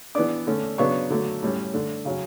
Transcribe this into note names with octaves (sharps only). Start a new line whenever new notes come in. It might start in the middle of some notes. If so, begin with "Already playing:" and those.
E3 B3 D4 D5 D6
D3 A3 C#4
C#3 F#3 B3 D4 C#5 C#6
D3 F#3 A3
A2 G3 C#4
D3 A3 D4
C#3 F#3 C#4